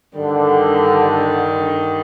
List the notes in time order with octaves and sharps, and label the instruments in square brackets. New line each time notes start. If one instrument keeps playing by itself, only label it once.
[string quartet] G2 D#3 G3 [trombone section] D3